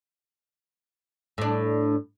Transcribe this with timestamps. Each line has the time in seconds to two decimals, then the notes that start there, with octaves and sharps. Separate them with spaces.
1.38 A2 D4